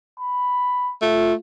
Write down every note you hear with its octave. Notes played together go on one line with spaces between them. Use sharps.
B5
A3 F4